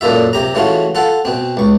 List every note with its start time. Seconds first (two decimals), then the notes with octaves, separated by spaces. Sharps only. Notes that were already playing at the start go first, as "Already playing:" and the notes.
0.01 F#2 A#2 D3 F4 E5
0.33 C3 G4 A#5
0.54 C#3 E3 A3 F4 F#4
0.95 F4 A4 F#5
1.25 B2 C4
1.57 C#2 C#6